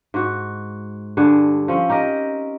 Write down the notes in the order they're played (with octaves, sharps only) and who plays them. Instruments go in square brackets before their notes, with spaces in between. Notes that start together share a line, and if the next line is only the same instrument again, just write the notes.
[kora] G#2 F#4
G2 D3 G#4
F3 C4 C#4
D#4 G4 A#4 D#5